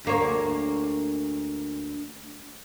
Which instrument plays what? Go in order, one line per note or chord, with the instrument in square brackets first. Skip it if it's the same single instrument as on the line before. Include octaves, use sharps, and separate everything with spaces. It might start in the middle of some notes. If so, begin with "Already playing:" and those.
[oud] D2 A#3 C#5